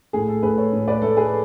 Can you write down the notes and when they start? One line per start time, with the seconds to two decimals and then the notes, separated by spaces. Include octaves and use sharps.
0.13 A2 G#4
0.28 A4
0.43 A2 G#4 B4
0.57 A4 C#5
0.73 A2
0.88 B4 D5
1.02 A3 A4
1.17 G#4 B4